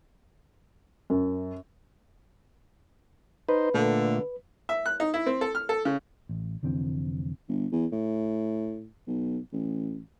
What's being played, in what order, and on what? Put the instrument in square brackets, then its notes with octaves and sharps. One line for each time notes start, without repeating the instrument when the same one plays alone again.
[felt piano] F#2
[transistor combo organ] D#4 C5 [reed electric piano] B4
[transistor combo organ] A#2 A3 [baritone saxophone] D3
[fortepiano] E5
F#6
D#4
E4
C4
A4
F6
A4
C#3
[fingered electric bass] A1
F1 D3 E3 C4
[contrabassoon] G1
E2
A2
B1
A1